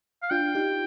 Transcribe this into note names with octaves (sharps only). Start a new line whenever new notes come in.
F5
D4 F4 G5
D#4 G4